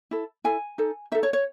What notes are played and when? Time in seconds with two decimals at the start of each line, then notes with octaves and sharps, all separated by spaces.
0.11 E4 A4
0.44 E4 A4 G#5
0.78 D#4 A4
1.12 D#4 A4 E5
1.23 C#5
1.33 C#5